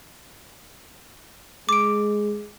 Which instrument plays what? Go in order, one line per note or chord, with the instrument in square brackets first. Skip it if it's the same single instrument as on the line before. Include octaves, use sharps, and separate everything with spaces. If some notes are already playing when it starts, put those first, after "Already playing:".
[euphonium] G#3 [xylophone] D6 D7